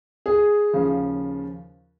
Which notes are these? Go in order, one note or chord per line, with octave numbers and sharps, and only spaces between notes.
G#4
D#2 C#3 F3